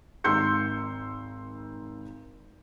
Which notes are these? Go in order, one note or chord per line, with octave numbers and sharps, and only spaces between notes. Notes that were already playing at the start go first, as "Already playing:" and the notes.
G#1 D#4 C6 E6 G6 C#7